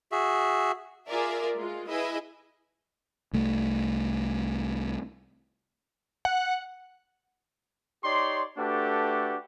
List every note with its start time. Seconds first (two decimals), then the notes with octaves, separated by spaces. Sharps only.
0.12 F#4 G#4 E5
1.08 F4 G#4 A#4 D5 E5
1.57 G#3 F4
1.89 E4 G#4 B4 D#5 E5 G#5
3.33 C2 A3
6.25 F#5
8.04 D#4 G4 C#5 D5 C6
8.58 A3 D4 F#4 G4 A4 B4